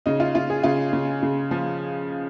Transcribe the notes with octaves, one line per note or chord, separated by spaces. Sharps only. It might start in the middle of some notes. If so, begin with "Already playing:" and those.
C#3 D#4
F4
C#3 F4
G#4
C#3 F4
C#3
C#3
F3